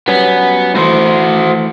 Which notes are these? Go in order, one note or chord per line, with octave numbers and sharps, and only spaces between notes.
F#3 G3 B3 C#4
E3 A3 F#4 C5